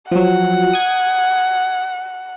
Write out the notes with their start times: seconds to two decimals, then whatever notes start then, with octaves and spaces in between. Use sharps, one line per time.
0.11 F3 F#3 F#5
0.73 D#6 G#6